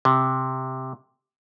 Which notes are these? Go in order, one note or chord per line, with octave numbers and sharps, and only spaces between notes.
C3